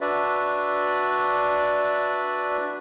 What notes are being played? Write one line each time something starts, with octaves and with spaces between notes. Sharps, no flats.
D4 F#4 B4 D5 E5